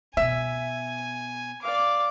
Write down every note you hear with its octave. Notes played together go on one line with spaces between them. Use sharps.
B2 B3 E5 G#5
D5 F5 D6